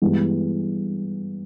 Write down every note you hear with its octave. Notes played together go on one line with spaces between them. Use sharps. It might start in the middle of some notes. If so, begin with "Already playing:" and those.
G2 E3 G#3 B3